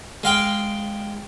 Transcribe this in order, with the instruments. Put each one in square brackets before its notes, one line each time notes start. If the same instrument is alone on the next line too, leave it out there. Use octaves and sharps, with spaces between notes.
[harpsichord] G#3 F5 G5